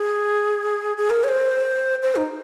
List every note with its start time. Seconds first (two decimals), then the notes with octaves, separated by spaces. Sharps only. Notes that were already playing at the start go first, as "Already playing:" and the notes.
Already playing: G#4
0.97 G#4
1.10 A#4
1.24 C#5
1.28 C5
2.03 C5
2.16 D#4